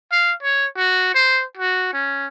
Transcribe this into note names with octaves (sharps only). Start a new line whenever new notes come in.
F5
C#5
F#4
C5
F#4
C#4